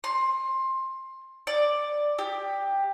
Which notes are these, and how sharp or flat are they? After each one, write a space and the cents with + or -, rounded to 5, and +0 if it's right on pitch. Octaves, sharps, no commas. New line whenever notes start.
C6 +20
D5 +5
G4 +10